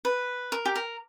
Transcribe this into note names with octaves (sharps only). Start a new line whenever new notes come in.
B4
A#4
G4
A#4